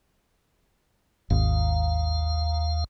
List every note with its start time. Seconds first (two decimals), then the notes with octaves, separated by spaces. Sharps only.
1.30 G#1 D#2 F5